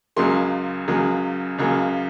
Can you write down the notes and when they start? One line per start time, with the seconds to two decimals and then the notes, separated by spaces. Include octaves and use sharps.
0.17 C#2 C#3 F#3 A#3 C6
0.88 C#2 C#3 F#3 A#3
1.58 C#2 C#3 F#3 A#3